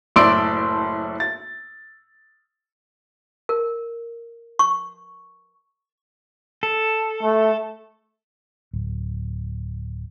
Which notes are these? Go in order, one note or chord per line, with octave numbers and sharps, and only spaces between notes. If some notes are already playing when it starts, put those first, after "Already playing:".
F#1 A2 D5 C6 E6 D7
A6
A#4
C#6
A4
A3
D1